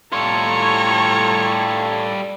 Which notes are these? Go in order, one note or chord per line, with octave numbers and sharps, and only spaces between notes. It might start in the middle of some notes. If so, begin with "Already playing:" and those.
A2 G3 F4 A4 C#5 A#5